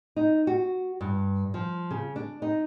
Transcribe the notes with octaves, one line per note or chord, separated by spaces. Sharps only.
D#4
F#4
G2
F3
C#3
D4
D#4